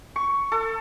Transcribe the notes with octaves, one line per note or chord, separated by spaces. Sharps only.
C#6
A4